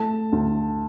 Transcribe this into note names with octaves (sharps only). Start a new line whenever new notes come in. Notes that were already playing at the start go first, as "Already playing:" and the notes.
Already playing: A3 A5
D2